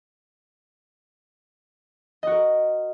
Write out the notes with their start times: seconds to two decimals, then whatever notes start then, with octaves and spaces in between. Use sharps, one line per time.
2.23 D#5
2.27 F#4
2.31 A#4